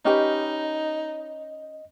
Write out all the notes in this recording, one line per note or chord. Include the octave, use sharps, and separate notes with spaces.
C#4 D#4 G4 B4 D#5